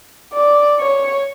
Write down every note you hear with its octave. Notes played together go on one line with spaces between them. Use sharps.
D5
C#5